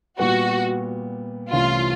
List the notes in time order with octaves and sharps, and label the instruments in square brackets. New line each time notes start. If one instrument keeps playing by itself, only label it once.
[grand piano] A#2 G3 B3 [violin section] F#4
[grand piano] C2 C3 E3 A3 C#4 [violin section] F4